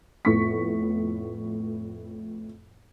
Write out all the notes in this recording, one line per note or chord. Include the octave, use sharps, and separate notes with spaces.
F2 A2 B3 C#6 B6